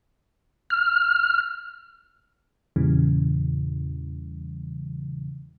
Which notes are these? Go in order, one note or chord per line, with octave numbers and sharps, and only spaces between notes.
F6
E2 A#2 C#3 E3 G3